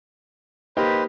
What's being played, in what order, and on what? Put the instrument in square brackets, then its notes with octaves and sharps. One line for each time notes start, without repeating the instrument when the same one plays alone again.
[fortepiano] A#3 D#4 G4 [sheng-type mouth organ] B4 C5